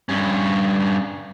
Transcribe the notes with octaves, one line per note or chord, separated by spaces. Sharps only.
G2 C#4